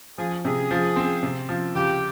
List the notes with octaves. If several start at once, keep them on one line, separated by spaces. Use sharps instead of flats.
F3 G#4
C3 G#4
F3
C4
C3
F3
C#2 G4